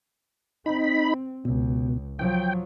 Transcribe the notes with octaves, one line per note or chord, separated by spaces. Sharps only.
C4 D#4 B5
C#2 B2
F3 F#3 G5